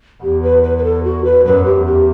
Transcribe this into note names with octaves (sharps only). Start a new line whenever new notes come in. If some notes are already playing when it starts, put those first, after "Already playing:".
E2 G4
B4
B4
B4
A4
F#4
B4
F#2 B4
G4
E2
G4